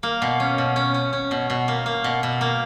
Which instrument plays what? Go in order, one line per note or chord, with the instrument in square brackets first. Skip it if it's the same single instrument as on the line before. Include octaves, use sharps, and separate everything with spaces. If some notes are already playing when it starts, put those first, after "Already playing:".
[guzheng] A#3
B2
C#4
B2
C#4
C#4
C#4
B2
B2
A#3
A#3
B2
B2
A#3